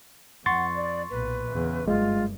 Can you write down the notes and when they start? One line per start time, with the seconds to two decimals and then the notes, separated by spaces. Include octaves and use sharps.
0.46 F2 F#5 C6 C#6 A6
0.75 D5
1.10 B1 A#2 B4
1.51 E2 C#3
1.88 F#1 G2 G#3 F4